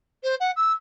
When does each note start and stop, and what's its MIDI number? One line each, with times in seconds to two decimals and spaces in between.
0.23 0.35 72
0.40 0.51 78
0.56 0.72 88